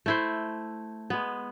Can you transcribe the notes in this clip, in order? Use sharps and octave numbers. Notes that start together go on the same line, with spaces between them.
A3 E4 C5
G#3 B3